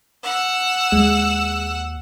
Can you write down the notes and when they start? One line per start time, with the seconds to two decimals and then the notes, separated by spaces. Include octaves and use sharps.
0.23 F#5 E6
0.92 D#2 G#3